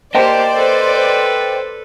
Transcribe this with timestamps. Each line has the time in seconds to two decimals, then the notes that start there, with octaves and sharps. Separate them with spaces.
0.15 A#3 G4 C5 D5 D#5 G5 A5
0.57 A4 B4